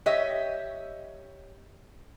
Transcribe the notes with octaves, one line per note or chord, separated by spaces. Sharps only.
G4 C#5 D#5 E5